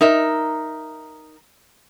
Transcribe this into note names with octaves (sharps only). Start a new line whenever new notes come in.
D#4 A#4 E5